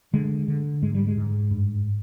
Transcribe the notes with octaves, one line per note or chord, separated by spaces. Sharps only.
D3 G#3
D3
G#2 G#3
G3
G#3
G#2
G2